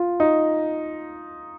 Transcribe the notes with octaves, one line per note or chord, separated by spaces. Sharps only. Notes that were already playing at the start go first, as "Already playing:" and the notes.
Already playing: F4
D#4